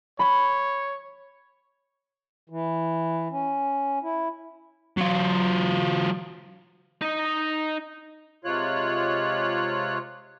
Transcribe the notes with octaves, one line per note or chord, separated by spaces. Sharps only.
C#5 B5
E3
C#4
E4
F#3 F4
D#4 D#5
C3 G#3 F4 C#5 F#6